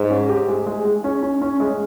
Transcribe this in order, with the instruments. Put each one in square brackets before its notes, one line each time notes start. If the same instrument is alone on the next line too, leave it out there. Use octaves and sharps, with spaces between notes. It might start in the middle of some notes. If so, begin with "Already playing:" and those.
Already playing: [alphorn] G#2
[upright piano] C#4
G4
G#3
G#3
G#3
C#4
C#4
C#4
G#3